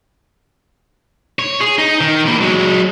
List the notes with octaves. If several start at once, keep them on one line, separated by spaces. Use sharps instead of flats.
C#5
G#4
D#4
D#3
E3 A#3
F#3 G#3